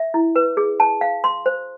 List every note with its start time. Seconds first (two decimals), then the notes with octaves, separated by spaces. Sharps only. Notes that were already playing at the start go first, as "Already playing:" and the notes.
Already playing: E5
0.14 E4
0.36 B4
0.57 G#4
0.80 A5
1.01 F5
1.24 C6
1.46 C5